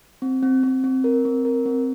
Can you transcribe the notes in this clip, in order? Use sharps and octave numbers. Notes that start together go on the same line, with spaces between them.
C4
C4
C4
C4
A#4
C4
A#4
C4